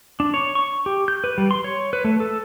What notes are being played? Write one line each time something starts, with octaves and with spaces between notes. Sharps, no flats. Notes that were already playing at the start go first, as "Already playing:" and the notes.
D4
C#5
C#6
G4
G6
B4
G3
C6
C#5
B4
A3
A4